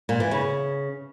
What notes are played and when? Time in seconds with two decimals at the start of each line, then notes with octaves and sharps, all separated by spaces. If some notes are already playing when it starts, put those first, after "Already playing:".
0.09 A#2
0.20 E3
0.31 C#3